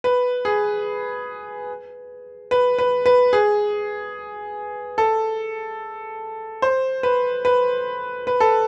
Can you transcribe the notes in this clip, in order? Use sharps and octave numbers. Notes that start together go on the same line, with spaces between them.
B4
G#4
B4
B4
B4
G#4
A4
C5
B4
B4
B4
A4